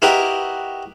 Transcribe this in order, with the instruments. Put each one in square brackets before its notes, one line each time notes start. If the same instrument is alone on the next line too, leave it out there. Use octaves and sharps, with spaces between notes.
[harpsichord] E4 F#4 G4 A#4 B4 D#5